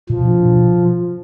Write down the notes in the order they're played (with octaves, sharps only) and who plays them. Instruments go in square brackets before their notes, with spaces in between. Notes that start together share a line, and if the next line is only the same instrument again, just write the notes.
[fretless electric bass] B2 [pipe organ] F3
[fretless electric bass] D4
B2